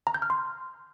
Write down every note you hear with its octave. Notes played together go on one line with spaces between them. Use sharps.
A#5
G6
F6
C6